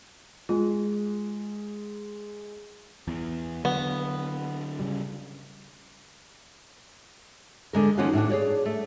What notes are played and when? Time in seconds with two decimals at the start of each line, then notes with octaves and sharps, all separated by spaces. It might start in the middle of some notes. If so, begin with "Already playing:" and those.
0.49 G#3 F4
3.08 E2
3.65 D3 F#3 B3
4.80 C#3 G3
7.73 D3 G#3 A#4
7.98 D#3 F3 A#3 C#4 F4 F#4
8.13 A2 D4 F#4
8.30 G#4 C#5 D5
8.66 A3